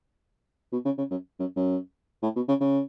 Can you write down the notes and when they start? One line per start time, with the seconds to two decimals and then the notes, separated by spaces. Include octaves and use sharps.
0.72 B2
0.85 C#3
0.98 C#3
1.10 F#2
1.39 F#2
1.56 F#2
2.23 A2
2.36 B2
2.48 C#3
2.60 C#3